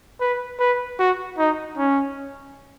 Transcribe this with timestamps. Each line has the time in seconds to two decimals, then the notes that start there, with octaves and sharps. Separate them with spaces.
0.20 B4
0.60 B4
0.99 F#4
1.38 D#4
1.78 C#4